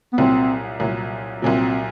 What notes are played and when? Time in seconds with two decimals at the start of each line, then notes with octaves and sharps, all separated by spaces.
0.13 B3
0.18 C2 A#2 F#3 C4
0.80 C2 A#2 F#3
1.42 C2 A#2 F#3 C4